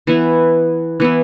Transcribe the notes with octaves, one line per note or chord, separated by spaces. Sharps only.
E3 B3 E4
E3 B3 E4